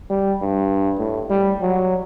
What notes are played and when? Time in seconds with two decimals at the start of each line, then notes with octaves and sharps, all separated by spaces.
0.10 G3
0.42 G2
0.99 A2
1.30 G3
1.61 F#3